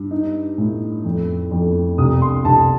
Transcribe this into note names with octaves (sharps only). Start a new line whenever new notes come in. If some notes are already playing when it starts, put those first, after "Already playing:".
Already playing: G2
D#4
A2
F2
F2
C2 D#6
C6
C2 A5